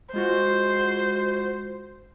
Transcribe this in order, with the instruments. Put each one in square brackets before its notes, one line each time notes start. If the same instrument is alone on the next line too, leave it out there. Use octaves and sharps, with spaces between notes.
[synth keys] G#3 F4 F#4 [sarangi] C5